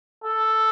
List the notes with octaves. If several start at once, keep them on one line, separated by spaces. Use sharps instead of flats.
A4